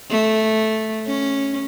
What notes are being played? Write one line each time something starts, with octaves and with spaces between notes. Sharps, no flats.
A3
C#4